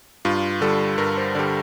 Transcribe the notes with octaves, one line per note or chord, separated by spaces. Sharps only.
G2 F4
D3 G3 A4
G2 A#4
C5
D3 G3 D5